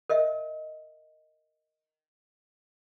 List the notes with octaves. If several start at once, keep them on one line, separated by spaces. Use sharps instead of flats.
A#4 D#5 E5